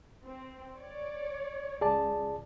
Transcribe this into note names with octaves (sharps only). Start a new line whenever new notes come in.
C4
C#5 D5
C#2 G#4 D5 A5